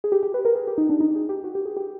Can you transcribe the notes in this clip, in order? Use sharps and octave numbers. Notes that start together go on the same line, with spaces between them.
G#4
G4
G4
B4
A#4
G#4
G4
D#4
D4
D#4
G#4
G4
F#4
G4
G#4
G4